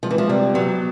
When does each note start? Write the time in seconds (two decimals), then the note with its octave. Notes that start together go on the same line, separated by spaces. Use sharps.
0.03 F3 G#3
0.11 E3
0.18 F3
0.29 C3 G3
0.54 F#3 B3